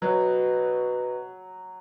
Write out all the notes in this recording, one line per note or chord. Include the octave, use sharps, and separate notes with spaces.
B2 F#3